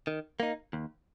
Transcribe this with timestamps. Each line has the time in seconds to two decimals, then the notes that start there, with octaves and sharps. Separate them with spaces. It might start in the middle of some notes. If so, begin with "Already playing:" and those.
0.07 D#3
0.40 A#3 D#4
0.73 D#2